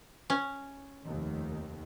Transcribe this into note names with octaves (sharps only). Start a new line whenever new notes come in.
C#4
F1 D#2 D#3